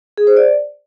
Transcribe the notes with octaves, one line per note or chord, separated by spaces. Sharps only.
G#4
C5
D5